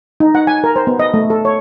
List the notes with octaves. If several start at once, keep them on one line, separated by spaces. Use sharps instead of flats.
D#4
F#5
G#5
A#4
C5
B3
D#5
A3
A4
C#5